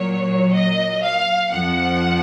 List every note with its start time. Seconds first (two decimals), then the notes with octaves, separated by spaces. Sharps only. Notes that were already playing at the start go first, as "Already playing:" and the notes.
Already playing: A#2 F#3 C#5
0.54 D#5
1.03 F5
1.52 F2 F3 F#5